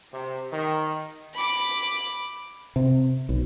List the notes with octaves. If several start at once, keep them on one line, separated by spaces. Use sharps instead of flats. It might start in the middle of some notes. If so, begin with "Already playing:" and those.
C3
D#3
B5 D6
C3
B1